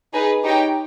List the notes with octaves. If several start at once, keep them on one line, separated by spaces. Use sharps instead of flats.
D#4 G#4 B4
D#4 G4 C#5 G5